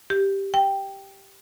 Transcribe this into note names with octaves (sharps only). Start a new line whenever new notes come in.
G4
G5